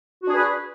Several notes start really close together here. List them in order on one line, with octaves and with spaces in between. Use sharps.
F#4 D4 G#4 B4